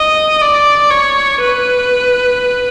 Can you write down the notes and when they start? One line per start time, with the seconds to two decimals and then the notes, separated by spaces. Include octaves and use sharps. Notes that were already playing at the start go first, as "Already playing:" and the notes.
Already playing: D#5
0.41 D5
0.91 C#5
1.41 B4